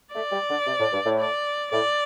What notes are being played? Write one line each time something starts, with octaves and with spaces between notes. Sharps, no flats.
A3 D5
G3
D3
C3
A2
G2
A2
D5
A2 D5